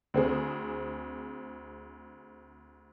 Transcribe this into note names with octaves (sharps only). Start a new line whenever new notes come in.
D2 C4 G#4